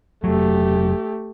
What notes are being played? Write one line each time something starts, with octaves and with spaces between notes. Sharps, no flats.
F1 F#3 A3 G4